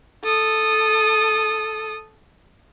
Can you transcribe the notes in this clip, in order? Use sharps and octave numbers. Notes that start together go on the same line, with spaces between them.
A4 D#6